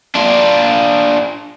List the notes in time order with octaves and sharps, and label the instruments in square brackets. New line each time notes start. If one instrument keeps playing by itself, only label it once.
[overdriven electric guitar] D4 F4